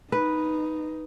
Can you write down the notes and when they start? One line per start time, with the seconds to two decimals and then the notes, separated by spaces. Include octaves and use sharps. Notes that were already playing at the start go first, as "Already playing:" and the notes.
0.12 D#4 B4